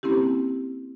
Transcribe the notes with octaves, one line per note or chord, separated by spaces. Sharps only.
A#3 C4 C#4 E4 G4